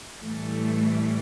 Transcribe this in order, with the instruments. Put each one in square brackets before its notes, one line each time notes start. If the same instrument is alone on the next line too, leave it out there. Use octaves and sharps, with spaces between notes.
[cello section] A2 E3 G3 A3